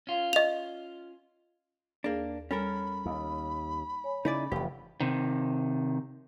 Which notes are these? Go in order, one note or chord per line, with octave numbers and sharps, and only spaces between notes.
C#4 F4
D#5 F7
D#2 A#3 D4 G#4
G3 C#4 A4 A#4 B5
D#2
C#5 G#5
C#3 D#4 E4 D5
F1 C2 F2 E3 G4
C3 D#3